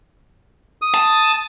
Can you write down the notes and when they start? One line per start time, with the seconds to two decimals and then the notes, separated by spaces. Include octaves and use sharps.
0.82 D#6
0.94 A5